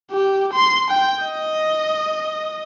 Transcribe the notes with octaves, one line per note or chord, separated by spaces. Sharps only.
G4
C6
G5
D#5